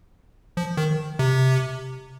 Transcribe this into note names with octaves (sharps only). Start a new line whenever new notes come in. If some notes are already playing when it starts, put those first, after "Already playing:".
F3
D#3
C3